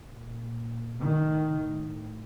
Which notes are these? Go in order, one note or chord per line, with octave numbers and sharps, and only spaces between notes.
A#2
A2 D#3
A2